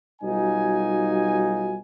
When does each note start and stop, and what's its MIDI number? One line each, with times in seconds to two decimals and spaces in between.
0.22 1.80 35
0.22 1.80 55
0.22 1.80 63
0.22 1.80 65
0.22 1.80 66
0.22 1.80 80